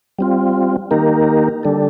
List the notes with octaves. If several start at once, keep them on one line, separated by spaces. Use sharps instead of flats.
G3 C4 F4
D#3 A#3 D#4 G4 A#4
D3 G3 D4 A4